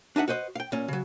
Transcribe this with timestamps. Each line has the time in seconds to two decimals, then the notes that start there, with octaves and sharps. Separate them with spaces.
0.16 D4 D#4 E5 F#5
0.28 F#4 B4 C5 D#5
0.56 F5 G5
0.72 A#2 C#4
0.88 C#3 F#3